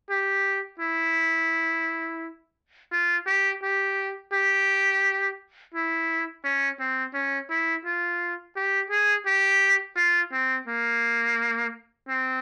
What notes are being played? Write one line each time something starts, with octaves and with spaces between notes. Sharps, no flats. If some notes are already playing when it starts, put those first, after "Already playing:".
G4
E4
F4
G4
G4
G4
E4
C#4
C4
C#4
E4
F4
G4
G#4
G4
F4
C4
A#3
C4